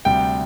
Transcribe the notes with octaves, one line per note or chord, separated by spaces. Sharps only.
D2 C3 G3 G5